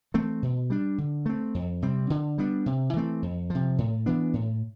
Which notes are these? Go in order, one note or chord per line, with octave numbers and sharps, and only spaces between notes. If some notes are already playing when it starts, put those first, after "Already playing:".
E3 A3 C4
B2
G3 D4
D3
A3 C4
F2
C3 G3 C4
D3
G3 B3 D4
C3
E3 A3 C4
F2
C3 F3
A2
E3 B3 D4
A2